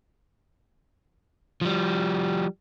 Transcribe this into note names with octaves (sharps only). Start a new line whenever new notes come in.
F3 G3